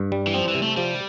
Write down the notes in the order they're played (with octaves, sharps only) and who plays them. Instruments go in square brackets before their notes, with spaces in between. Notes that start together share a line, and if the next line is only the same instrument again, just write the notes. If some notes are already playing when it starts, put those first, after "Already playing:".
Already playing: [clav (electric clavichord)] G2
G3
[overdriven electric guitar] E3
[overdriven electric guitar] F3 [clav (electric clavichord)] C4
[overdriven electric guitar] E3
[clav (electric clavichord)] C3
[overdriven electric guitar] A3
[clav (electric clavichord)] F3 [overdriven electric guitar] G3